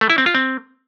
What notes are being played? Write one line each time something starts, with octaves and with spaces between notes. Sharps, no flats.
A3
E4
C4
F4
C4